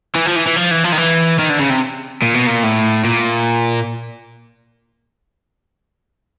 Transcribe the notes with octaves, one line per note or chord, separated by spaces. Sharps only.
E3
F3
E3
E3
F3
E3
F3
D#3
E3
D#3
D3
C#3
C3
A#2
B2
A#2
A2
A#2